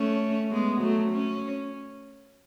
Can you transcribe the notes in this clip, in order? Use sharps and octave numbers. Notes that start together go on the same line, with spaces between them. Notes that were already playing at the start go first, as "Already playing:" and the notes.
Already playing: A3 C#4
G#3 B3
F#3 A3
C#4